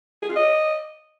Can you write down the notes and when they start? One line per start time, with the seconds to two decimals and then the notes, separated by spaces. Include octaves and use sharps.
0.22 G#4
0.29 F4
0.36 D#5